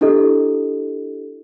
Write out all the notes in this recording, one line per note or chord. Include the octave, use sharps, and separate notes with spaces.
D4 E4 G4 A4 D#5